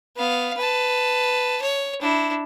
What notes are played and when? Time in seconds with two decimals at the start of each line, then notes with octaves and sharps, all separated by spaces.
0.16 B3 F5
0.57 B4 A5
1.62 C#5
2.01 D4 E4